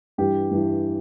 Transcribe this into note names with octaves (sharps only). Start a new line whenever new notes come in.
G2 E3 G4
G2 E3